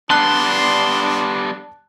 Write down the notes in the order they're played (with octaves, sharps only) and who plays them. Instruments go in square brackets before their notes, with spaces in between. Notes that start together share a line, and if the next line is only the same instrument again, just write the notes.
[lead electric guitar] G3 B3 [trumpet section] D4 [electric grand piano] A5 F#6 [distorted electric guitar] C6